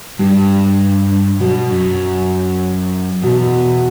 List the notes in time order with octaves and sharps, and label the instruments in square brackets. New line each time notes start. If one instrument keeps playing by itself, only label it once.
[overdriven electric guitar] G2 [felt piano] G3
[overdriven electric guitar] B2 [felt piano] F#3
[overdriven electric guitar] F#2
[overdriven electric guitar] E2 [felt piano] B2